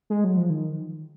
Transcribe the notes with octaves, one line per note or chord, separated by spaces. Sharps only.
G#3
F#3
F3
D#3